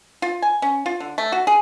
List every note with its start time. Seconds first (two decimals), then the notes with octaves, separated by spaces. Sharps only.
0.22 F4
0.42 G#5
0.62 C#4
0.86 F4
1.00 D3
1.18 A3
1.32 F#4
1.47 G#4